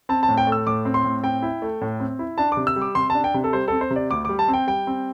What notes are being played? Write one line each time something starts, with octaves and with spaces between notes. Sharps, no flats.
C4 A5
A5
A2
G5
A3
E6
A2 D6
C4
C6
A2
C4 G5
E4
A3
A2
C4
E4
D4 A5
C3 D6
E6
G3
D6
C3 C6
D4 A5
G5
C3
A4
G3 C5
C4 A4
C5
C3
D5
D2 D6
G3 D6
A5
C4
G5
G3 G5
C4